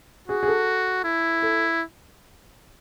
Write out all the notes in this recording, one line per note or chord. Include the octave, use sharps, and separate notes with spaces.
F#4 G#4
G#4
A4
E4
A4